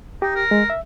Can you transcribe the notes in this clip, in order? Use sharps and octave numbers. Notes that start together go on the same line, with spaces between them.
D#4 G4
A#4
G#3
E5